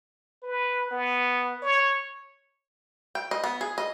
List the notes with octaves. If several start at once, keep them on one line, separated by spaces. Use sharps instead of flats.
B4
B3
C#5
G5
D#5
B3
G#4
D#5